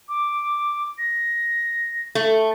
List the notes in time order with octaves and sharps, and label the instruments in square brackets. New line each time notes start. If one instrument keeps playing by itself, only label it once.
[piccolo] D6
A#6
[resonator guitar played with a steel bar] A3